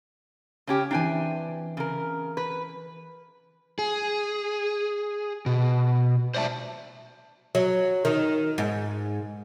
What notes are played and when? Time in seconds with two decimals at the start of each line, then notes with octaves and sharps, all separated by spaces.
0.67 C#3 C#4 G4
0.91 E3 C4 D4 E4 G5 G#5
1.77 C#3 A#4
2.37 B4
3.79 G#4
5.46 B2
6.34 C5 D5 E5 A5
7.55 F#3
8.05 D#3
8.58 G#2